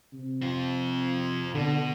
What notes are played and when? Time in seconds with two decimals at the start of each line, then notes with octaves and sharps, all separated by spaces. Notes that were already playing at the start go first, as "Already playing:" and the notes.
0.13 C3
0.42 C4 F4
1.55 B2 D3